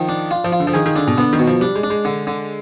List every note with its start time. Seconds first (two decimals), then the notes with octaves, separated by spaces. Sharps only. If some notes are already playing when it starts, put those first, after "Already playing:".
Already playing: D#3 F3
0.09 D4
0.31 F4
0.44 F3
0.52 F4
0.60 D3
0.67 F3
0.74 D#3 G#4
0.86 D#3
0.96 D3 D4
1.07 B2
1.17 D3 B3
1.33 D#3
1.39 B2
1.47 F3
1.61 G3 D4
1.75 G#3
1.84 D4
1.90 G#3
2.05 D3
2.27 D3